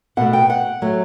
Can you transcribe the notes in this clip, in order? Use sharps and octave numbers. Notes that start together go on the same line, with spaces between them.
B2 A3 F#5
G5
F#5
F#3 A3